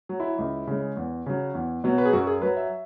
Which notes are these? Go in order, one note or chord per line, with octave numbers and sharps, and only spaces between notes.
F#3
E4
C#2
C#3 G#3
E2
C#3 F#3
E2
B2 F#3
B4
G#4
F#2 F#4
G#4
F#3 B4
E5